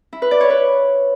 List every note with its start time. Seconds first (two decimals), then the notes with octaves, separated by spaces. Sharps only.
0.13 E4
0.22 B4
0.31 D5
0.41 C#5
0.50 B4